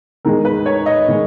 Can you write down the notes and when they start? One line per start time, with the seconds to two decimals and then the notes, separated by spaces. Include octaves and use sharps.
0.25 E2 D#3 G#3 A#4
0.45 B4
0.66 C#5
0.86 D#5
1.08 D#3 G#3